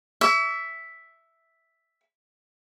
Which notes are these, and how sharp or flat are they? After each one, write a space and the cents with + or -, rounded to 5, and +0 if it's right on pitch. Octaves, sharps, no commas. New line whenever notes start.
E5 +0 C#6 +45